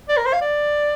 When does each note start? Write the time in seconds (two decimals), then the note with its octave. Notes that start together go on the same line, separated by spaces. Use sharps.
0.09 D5
0.17 A#4
0.26 C5
0.33 F5
0.42 D5